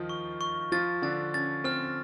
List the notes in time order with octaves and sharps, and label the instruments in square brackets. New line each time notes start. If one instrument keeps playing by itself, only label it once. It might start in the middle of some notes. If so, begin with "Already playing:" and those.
Already playing: [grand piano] D#3 F3 D#4 F4
[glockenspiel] C#6
C#6
[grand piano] F3 F4 [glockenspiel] A6
[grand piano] D3 D4 [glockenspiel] A6
[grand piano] C#4 [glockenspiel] A6
[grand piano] C4 [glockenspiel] F6